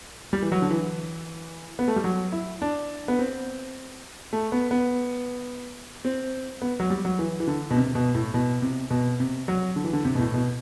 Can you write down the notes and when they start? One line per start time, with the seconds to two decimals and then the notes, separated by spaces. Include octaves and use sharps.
0.33 G3
0.42 E3
0.52 F#3
0.62 D3
0.71 E3
1.79 B3
1.88 A3
1.96 G3
2.04 F#3
2.32 E4
2.62 D4
3.08 B3
3.19 C4
4.33 A3
4.52 B3
4.71 B3
6.05 C4
6.62 B3
6.80 F#3
6.90 G3
7.05 F#3
7.19 E3
7.40 E3
7.47 D3
7.71 B2
7.76 C3
7.95 B2
8.15 A2
8.34 B2
8.62 C3
8.91 B2
9.20 C3
9.48 F#3
9.76 D3
9.84 E3
9.93 D3
10.05 C3
10.15 B2
10.19 A2
10.34 B2